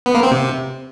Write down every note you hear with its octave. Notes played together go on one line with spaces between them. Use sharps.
B3
A#3
C4
C3